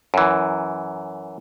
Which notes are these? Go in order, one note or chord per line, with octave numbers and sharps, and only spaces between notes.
F#2 E3